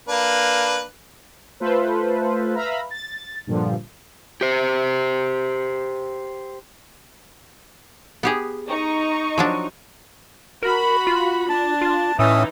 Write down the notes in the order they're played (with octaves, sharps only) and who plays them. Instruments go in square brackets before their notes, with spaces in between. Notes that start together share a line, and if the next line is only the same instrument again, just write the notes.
[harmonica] A#3 D4 B4
[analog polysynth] A3 F4 A4 B4 C5
B4 E5 F5 A#5 B5
A6
G2 A#2 D3 F3
[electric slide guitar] G4 C5
[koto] B3 G4 G#4
[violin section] D#4 C#6
[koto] F3 F#3 D4
[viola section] F#4 B5 [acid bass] A#4
[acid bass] F4
[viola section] D4 [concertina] A5
[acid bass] F4
[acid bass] A2 [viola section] E3 D#4 [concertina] C#4 E5 D#6